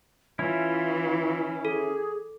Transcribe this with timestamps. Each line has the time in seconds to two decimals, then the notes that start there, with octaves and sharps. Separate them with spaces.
0.39 E3 C#4 E4 F4
1.65 G#4 A4